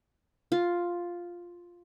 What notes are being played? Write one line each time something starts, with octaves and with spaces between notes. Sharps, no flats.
F4